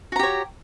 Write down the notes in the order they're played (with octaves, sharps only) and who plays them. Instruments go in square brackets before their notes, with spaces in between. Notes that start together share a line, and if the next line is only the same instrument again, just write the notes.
[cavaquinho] F#4
A#5
G4
C#5